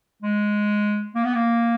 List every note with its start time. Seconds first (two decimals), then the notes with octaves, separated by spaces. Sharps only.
0.23 G#3
1.15 A#3
1.25 B3
1.34 A#3